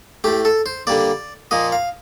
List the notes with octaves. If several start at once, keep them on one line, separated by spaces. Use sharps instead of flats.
A2 A3 G4
A4
C5
D3 G3 A#3 D5
A#2 F3 A#3 D#5
F5